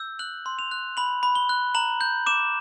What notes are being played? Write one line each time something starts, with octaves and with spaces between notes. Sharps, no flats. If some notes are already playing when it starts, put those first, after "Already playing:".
Already playing: E6 G6
F#6 F#7
C6
F7
F#6
B5 F#7
B5
G7
F#6
A#5 F#7
G6
D6 E7